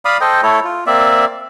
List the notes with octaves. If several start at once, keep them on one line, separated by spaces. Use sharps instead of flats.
D5 F5 B5 D#6
A4 C5 D#5 G5
A3 E4 A4 C#5
F4
A#3 C4 D5 E5